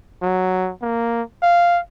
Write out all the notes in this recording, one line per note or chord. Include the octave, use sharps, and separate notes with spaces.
F#3
A#3
F5